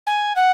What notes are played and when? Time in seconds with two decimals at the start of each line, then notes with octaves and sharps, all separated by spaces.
0.06 G#5
0.36 F#5